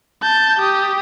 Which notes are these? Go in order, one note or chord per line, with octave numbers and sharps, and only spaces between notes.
A5 G6
G4 D#6